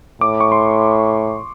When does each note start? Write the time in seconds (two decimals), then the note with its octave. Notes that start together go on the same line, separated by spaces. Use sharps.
0.21 A2 D6
0.41 C#6
0.52 C6